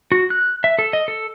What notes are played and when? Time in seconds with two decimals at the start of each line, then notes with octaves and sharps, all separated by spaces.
0.12 F#4
0.30 F#6
0.64 E5
0.79 A4
0.93 D#5
1.08 A4